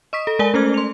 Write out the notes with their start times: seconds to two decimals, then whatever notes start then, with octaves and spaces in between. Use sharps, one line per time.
0.13 D#5 C#6 D#6 B6
0.27 A4
0.39 G#3 A#4 D5 G#5 G7
0.54 A3 C#4 A4 C5 F6 G#6
0.74 C6 F7